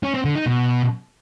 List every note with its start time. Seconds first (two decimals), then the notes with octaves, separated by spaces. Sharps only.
0.03 C#4
0.14 C4
0.25 D3
0.35 D#4
0.46 B2